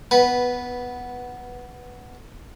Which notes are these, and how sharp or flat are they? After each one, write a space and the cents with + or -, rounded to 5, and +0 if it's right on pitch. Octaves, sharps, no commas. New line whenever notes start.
B3 +0 B4 -10